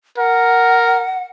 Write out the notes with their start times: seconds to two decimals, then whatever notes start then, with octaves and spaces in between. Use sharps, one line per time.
0.18 A#4 F#5